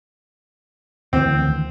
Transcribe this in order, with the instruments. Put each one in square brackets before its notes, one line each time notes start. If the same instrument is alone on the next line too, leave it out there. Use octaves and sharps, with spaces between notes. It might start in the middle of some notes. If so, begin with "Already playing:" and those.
[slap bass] D2 D#3 E3 [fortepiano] C4